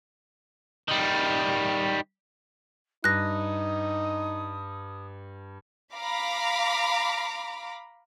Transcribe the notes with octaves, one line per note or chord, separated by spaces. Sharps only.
D#3 G3
G2 D#4 D#6 F#6 A#6
F5 A#5 B5 D6